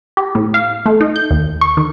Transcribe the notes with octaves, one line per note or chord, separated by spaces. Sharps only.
G4
A2
F5
A3
D#4
G6
D#2
C#6
D#3